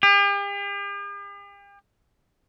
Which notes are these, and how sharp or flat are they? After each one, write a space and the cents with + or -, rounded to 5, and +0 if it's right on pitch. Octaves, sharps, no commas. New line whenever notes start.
G4 +45